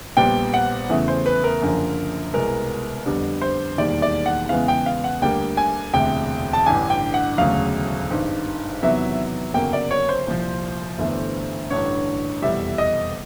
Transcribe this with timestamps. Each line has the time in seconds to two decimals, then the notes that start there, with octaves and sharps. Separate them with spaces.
0.17 A#1 A#2 G3 B3 G5
0.54 F#5
0.89 E2 C#3 E3 A3
1.08 C5
1.26 B4
1.44 A#4
1.61 F#1 F#2 D3 F3
2.34 C2 B2 G#3 B3 A#4
3.06 F2 D3 G3 B3
3.42 C5
3.78 E1 D#2 D#3 G3 D5
4.02 D5
4.26 F#5
4.49 E2 C#3 E3 G#3 B3 F5
4.68 G5
4.86 F5
5.04 F#5
5.22 D2 D3 G3 A#3 G5
5.57 G#5
5.93 E1 D2 C3 G5
6.53 A5
6.66 A1 G2 D3 G#5
6.90 G5
7.14 F#5
7.38 E1 D2 C#3 F#3 F5
8.10 G#1 G2 D#3
8.82 E2 C3 D#3 F#3 B3 E5
9.54 G1 F#2 C#3 F#3 A#3 G5
9.73 D5
9.91 C#5
10.09 C5
10.27 C2 A#2 F3
10.98 G1 G2 E3 A3
11.70 A1 G2 D3 C#5
12.42 F1 E2 B2 G3 E5
12.78 D#5